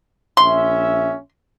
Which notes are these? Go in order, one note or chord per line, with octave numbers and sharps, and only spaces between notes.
A#1 C#4 E5 C6